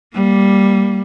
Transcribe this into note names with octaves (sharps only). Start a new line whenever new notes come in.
G3 A#3